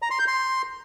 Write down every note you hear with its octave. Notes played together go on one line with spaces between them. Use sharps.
A#5
C6
G6
C6